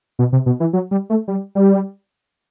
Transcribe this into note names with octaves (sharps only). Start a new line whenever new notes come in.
B2
C3
B2
E3
F#3
G3
A3
G3
G3